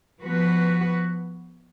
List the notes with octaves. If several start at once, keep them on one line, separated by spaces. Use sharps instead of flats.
F3 B3 F#4 B4